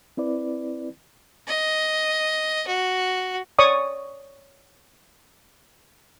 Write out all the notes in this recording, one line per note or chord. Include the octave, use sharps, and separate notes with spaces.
C4 E4 B4 D5
D#5
F#4
C#5 D5 C#6 D#6